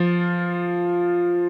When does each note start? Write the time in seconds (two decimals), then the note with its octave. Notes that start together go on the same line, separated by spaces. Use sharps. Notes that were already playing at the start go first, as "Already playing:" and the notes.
Already playing: F3 F4